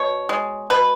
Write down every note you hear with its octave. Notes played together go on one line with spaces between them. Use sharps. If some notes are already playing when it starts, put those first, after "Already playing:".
Already playing: B2 C#5
G#3
B2 B4